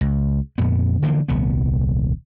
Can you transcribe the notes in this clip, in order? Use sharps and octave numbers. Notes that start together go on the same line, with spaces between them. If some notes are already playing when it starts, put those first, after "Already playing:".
C#2
F2 A#2 B3
D3 E3 F3 A#3
D#1 C2 D#3 B3